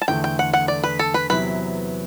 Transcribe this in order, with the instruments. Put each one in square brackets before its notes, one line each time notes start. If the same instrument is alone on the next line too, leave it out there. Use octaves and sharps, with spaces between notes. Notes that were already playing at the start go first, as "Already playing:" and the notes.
[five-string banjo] A5
[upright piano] E2 D3 A3 [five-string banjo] G5
[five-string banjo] G5
F#5
F#5
D5
B4
A4
B4
[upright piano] E2 C3 F#3 B3 E4 [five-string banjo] B4